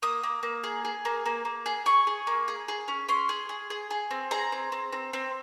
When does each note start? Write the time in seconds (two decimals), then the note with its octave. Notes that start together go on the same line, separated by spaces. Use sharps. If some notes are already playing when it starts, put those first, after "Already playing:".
0.02 A#3 D#6
0.23 A#3
0.43 A#3
0.64 G#4
0.85 G#4
1.05 A#3
1.26 A#3
1.45 A#3
1.66 G#4
1.86 G#4 C#6
2.07 G#4
2.27 A#3
2.48 G#4
2.68 G#4
2.88 C#4
3.08 C#4 C6
3.29 G#4
3.49 G#4
3.70 G#4
3.91 G#4
4.11 C4
4.31 G#4 A#5
4.52 C4
4.72 C4
4.93 C4
5.13 C4